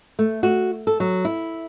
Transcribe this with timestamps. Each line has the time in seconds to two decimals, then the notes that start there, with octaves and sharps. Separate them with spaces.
0.19 A3
0.43 F#4
0.87 A4
1.00 F#3
1.25 E4